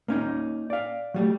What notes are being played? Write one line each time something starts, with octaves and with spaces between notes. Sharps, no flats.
A#3 C#4 D#4
D5 F5
F#3 G3 A3